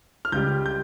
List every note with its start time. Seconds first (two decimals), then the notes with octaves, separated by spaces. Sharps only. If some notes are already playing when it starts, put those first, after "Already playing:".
0.25 F6
0.32 C#2 C#3 G3 G6
0.66 G6